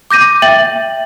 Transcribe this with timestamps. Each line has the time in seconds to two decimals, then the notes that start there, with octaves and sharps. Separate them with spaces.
0.11 D6 G6 A#6 D#7
0.42 E5 G5 A6 F#7